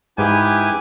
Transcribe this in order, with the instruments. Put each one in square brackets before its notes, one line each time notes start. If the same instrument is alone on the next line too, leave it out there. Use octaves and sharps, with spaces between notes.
[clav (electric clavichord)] G#2 [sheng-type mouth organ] E4 G#4 B4 [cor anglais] G4 [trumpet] G#5